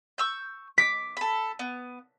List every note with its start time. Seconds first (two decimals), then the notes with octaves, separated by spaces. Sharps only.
0.18 C#6 E6 G6
0.78 D6 B6
1.17 A4 B5
1.59 B3